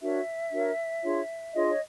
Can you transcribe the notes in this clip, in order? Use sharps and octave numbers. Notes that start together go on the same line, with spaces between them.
D4 F#4 A#4 C#5 E5
D4 F#4 A#4 C#5
D4 F4 G#4 C#5
D4 F4 G#4 C#5 D#5
C#5